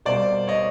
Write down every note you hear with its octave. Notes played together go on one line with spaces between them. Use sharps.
B2 G3 A#3 C5 D5
C#5 D#5